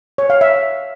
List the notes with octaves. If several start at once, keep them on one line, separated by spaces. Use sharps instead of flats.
C#5
F5
E5